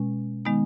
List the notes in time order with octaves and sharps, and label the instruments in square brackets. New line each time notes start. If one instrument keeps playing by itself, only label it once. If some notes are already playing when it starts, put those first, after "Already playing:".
Already playing: [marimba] B2 G#3 C#4
D#3 G#3 B3 D#4